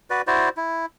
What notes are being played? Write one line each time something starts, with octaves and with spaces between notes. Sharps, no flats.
F#4 B4 D5
E4 F#4 C5 D5
E4